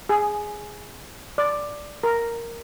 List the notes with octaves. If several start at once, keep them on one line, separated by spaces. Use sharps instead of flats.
G#4
D5
A#4